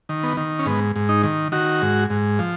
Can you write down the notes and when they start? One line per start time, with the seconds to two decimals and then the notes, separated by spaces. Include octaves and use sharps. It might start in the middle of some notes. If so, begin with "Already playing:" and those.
0.09 D#3
0.23 B3
0.37 D#3
0.59 C#4
0.66 G#2 B3
0.96 G#2
1.09 D#4
1.23 D#3
1.52 D#3 F#4
1.82 G#2
2.10 G#2
2.39 F3